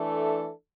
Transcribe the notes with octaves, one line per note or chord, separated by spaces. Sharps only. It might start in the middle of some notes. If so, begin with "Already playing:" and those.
Already playing: E3 A3 D4 A4